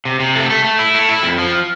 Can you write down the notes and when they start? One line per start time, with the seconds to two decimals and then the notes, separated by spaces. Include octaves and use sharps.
0.05 C3
0.20 C3
0.36 A3
0.50 A3
0.64 A3
0.79 E4
0.95 A3
1.09 E4
1.23 F2
1.38 F3